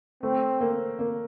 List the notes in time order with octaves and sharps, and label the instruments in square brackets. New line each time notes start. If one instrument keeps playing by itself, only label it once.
[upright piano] A3 [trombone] C4
[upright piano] A#3
A#3